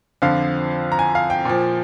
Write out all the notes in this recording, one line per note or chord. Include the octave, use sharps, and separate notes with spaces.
F2 D3 F3 F5
A#5
G#5
F5
G5
A#2 F3